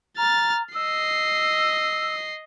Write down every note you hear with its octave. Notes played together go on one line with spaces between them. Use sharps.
A#5 F6 A6
D#5 E6 C7